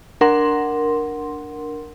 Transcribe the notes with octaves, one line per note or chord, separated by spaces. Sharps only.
D4 A#4 F#5 C6